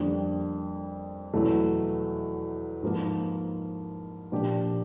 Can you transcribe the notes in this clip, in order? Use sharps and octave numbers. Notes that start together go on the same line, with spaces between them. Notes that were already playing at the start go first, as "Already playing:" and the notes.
Already playing: F2 D3 G3 A#3 D4
E2 B2 F#3 A3
G#2 F3 A#3
A#2 F3 A#3 D4 G4